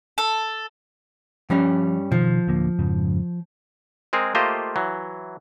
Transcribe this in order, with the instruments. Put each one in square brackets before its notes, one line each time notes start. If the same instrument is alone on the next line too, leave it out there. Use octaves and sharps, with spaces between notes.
[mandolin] A4
[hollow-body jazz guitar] G2 G3 C#4 [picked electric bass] F3
[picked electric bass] B2 D#3 [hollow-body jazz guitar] F3
[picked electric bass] D1 D3 A#3
F2 G#2 C#3
[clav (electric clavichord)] G#3 C4 G#4 A#4
A3 A#3 F4 G4 C5 D#5
E3 F#3